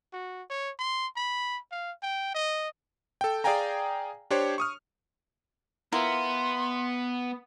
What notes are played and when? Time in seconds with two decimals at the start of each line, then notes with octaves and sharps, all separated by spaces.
0.13 F#4
0.50 C#5
0.79 C6
1.16 B5
1.72 F5
2.03 G5
2.35 D#5
3.21 A4 G5
3.44 G#4 D5 F5 G5 G#5 A#5
4.31 D4 G4 C5 C#5
4.58 C#6 D#6 F6
5.92 B3 E4 F4 A#4 C6